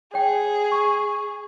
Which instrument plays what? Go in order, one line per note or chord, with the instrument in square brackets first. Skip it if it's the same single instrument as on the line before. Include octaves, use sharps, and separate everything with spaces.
[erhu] G#4 [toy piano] C#5 G5
[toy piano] C#6